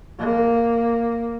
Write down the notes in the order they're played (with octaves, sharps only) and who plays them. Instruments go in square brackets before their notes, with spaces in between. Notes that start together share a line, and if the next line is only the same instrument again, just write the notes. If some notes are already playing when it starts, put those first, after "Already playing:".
[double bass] A#3